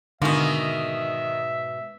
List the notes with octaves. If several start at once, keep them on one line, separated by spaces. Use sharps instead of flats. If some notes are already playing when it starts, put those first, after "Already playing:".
G#2 B2 D3 D#3 A#3 E5